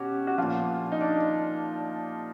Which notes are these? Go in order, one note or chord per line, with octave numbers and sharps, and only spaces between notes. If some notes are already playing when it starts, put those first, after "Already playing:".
Already playing: B2 C#4 F#4 G4
F#4
A#2 F3 F4
D#4
D4